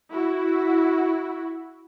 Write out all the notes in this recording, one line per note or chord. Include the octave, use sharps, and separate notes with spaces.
E4 F#4